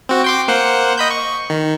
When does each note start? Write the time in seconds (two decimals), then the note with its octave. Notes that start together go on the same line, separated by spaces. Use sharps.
0.09 C4 F#4
0.24 G5 C6 D6
0.48 A#3 C5 F#5
0.98 D#5 B5 G6
1.11 C#6
1.50 D#3